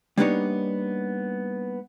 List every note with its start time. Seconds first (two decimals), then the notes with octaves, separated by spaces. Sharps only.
0.18 G3 A#3 B3 D4 D#4 C#5